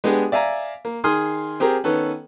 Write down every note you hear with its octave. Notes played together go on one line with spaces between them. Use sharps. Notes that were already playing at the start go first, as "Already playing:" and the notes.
G#3 B3 D4 G4 G#4
D5 E5 F5 G#5 A#5
A#3
D#3 G#4 G#5 C6 D#6 F6
C4 G4 G#4 A#4
D#3 B3 C#4 A4 B4